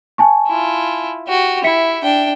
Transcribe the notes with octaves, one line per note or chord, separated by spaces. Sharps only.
G#5 A5 C#6
E4 F4
F#4 G4
E4 E5 B6 C#7
D4 G5